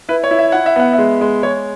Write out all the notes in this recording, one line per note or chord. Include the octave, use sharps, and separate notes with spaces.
E4 B4
C#5
E4
E5
E4 F#5
E5
B3 F#5
E5
G#3
G#3
G#3 C#5